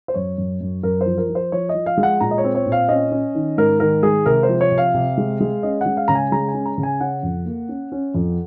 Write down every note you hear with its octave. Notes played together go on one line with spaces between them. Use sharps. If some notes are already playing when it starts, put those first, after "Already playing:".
C5
F#2 C#5
F#2
F#2
F#2 A#4
C5
F3
A#4
F3
C5
F3 C#5
D#5
F3
F5
G#3
F#5
A#2 A#5
D#5
C#5
C4
C#5
A#2
F5
C#4 D#5
C#4
D#3
G#2 A#4
D#3 A#4
G#3 G#4
C3 A#4
C5
F3
C#5
C3
F5
C3
G#3
G#3
C#4 D#5
G#3 F#5
F5
C#3 A#5
G#5
G#3 A#5
G#5
C#4
A#5
C#3
G#5
C#4 F#5
F2
A#3
C#4
C#4
F2